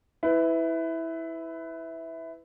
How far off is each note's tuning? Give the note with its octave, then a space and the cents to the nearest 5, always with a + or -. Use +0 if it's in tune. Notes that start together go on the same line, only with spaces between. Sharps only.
E4 -10 B4 +20